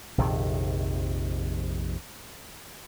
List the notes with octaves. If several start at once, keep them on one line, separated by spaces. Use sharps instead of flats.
A#1 F2 C3 D#3